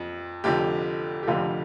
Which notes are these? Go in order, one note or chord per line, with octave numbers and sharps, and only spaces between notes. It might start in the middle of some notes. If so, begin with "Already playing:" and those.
Already playing: F2 F3
F1 F2 D3 F3 G4
G4
F1 F2 D3 F3 F4